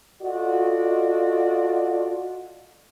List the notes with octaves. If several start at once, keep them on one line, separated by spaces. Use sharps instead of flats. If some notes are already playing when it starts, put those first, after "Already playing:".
F4 F#4 A4 D5 D#5